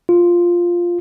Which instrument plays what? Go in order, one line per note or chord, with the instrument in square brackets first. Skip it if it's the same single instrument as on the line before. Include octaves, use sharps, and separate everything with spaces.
[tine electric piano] F4